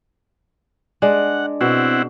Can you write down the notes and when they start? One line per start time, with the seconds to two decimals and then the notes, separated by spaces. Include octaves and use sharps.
1.02 G#3 D4 F#5
1.61 B2 C4 E4 F#5